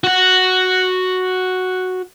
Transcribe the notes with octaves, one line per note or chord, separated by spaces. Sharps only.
F#4 F#5